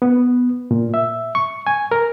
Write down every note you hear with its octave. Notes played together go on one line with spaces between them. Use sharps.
B3
A#2
E5
C#6
G#5
A#4